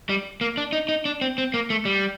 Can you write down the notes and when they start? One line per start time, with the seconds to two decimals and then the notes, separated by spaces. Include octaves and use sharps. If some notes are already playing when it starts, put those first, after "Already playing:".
0.09 G3
0.41 A#3
0.57 D4
0.73 D#4
0.89 D#4
1.05 D4
1.21 C4
1.38 C4
1.54 A#3
1.70 A3
1.85 G3